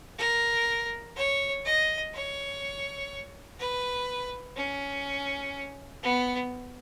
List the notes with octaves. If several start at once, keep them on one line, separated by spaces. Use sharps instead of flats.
A#4
C#5
D#5
C#5
B4
C#4
B3